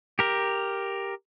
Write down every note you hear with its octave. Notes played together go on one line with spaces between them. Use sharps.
G4 A#4